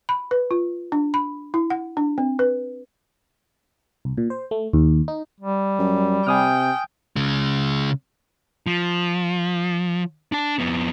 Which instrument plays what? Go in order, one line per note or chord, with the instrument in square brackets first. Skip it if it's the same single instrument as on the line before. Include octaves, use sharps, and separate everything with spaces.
[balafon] B5
B4
F4
D4
B5
E4
F#5
D4
C4
B4
[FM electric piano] C2
A#2
C5
A3
D#2
D#4
[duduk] G3
[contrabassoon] F#2
[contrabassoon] C3 [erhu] G5 [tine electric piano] G#5 D#6 F6
[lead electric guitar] C#3 G#3
F3
D4 A5
F2 B3